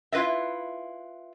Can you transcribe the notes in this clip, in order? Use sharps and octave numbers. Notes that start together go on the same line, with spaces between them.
E4 F4 B4 D#5 E5